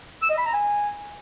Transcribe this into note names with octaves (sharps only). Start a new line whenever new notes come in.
E6
D#5
B5
A#5
G#5